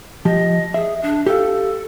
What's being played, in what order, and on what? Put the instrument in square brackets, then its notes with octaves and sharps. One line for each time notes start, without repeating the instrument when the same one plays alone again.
[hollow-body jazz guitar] F3 G4 [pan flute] D#5
[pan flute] G#4 [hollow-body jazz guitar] E5
[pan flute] D4
[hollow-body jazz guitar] G4 F5 [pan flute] A4